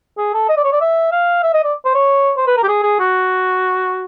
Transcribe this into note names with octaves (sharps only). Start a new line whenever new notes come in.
G#4
A4
D#5
D5
C#5
D5
E5
F5
E5
D#5
D5
C5
C#5
C5
B4
A#4
G4
G#4
G#4
F#4